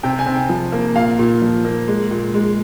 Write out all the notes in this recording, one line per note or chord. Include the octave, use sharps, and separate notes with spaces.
C3 G5
G#5
C3
G5
F3
A#3
A#2 F5
A#2
F3
A#3
G#3
A#2
G#3